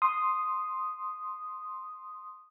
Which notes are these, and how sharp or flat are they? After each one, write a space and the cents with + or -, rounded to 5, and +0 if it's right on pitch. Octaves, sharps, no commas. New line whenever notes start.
C6 +0 D#6 +0